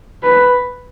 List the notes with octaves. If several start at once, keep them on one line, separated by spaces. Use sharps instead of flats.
B4